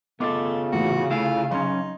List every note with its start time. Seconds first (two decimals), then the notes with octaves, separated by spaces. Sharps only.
0.20 C#3 A3 B3 F4 A4 D#5 D6
0.73 A2 E3 F#4
1.11 A3 E4 F4 F5 G#5
1.51 F#3 C#4 D#4 C6